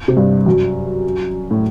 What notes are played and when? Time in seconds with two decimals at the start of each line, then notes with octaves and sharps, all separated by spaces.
0.08 C3
0.17 G2
0.46 F#2
1.51 A2